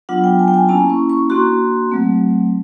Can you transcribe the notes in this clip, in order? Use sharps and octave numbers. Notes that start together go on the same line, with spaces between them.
F#3 B3 D4 F4 F#5
G5
G#5
G5
G#5
A#3 C#4 E4 A5
C#6
C#6
A#3 D4 F#4 C6
F#3 A3 C4